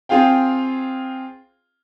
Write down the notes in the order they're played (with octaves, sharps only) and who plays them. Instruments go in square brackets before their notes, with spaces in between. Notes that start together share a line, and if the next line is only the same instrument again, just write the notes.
[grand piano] C4 F4 G#4 F5 G5